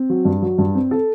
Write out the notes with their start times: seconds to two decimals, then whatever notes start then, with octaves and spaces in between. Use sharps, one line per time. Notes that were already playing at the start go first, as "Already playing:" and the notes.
Already playing: C4
0.10 F#3
0.25 G2
0.42 F#3
0.58 G2
0.75 C4
0.91 A4